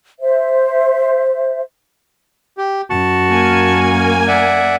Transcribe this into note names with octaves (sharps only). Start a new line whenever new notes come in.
C5 E5
G4
F#2 F#4 A5
A#3 A#4 G#5
D5 E5 F#5